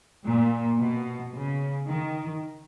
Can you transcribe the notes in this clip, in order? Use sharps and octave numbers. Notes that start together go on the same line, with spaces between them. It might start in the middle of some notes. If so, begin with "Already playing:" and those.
A#2
B2
C#3
D#3